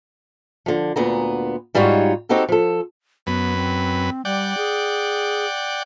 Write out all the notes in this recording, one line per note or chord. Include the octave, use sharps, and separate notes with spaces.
D3 F3
D2 A#2 B3 A#5
G#2 G3 D#4 F4 F#4 C#5
C4 D#4 F#4 G4 A4
F3 A4
F#2 B3 B4
C4
G3 D5 F#5 G5
G#4